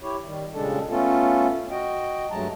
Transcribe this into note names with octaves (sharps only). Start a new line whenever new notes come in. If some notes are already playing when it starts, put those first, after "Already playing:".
E4 G4 C#5
D#3 G3
A#2 C#3 G3 G#3 D4 A4
A3 B3 C#4 F4 A4
F#4 D#5 G5
G2 F#3 G#3 A3 A5 A#5